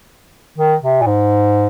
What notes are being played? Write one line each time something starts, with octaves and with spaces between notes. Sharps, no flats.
D#3
C3
A#2
G#2